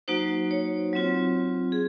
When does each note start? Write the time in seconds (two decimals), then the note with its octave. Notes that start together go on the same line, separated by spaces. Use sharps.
0.08 F#3 A#3 D#4 F#4 C5
0.51 C#5
0.93 F#3 C4 F4
1.72 G#4